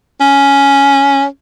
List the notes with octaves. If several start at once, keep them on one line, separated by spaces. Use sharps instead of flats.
C#4